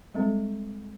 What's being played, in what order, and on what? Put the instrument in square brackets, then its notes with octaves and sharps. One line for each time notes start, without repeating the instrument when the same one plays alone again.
[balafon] G3 G#3 C4 A4